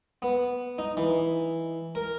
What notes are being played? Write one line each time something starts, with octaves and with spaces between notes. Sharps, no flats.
B3
D#4
E3
A#4